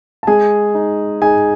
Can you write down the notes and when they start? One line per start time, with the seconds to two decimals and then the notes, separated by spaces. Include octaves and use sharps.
0.23 A5
0.27 G#3 G#4 G#5
0.74 D#4
1.22 D#4 G#4 G#5